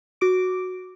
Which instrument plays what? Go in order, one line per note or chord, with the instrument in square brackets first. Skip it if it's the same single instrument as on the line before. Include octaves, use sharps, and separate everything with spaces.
[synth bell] F#4 D6 D7